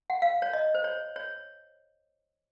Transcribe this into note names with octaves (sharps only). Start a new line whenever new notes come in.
F#5
F5
C#5
D#5
C5
C#5
C#5